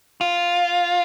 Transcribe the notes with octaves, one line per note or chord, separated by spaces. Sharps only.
F4